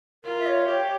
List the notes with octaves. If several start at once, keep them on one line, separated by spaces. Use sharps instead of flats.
F4 A#4
E5
C#5
G4 C#5